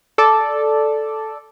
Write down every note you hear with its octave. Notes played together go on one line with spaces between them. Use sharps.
A4 D5